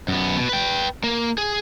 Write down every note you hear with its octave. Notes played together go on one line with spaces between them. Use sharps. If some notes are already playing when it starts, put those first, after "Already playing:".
F#2 B3
B2
B4 G5
A#3
G#4